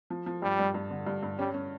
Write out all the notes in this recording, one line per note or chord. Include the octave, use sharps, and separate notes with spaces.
F3
F3
G2 G3
G2
G2
D3
G2
G2
G3 C#4
C#4